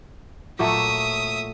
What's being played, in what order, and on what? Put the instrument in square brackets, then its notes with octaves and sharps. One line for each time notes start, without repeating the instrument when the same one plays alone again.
[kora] A#2 F#3 A3 [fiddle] E5 D#6